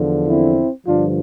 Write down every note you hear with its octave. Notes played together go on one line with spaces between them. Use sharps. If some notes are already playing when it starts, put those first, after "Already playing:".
Already playing: E2 D3 F3
C4 E4
G2 D3 F3 D4 F4